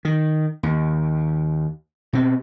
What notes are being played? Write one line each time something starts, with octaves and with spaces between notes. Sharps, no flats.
D#3
D#2
B2 C4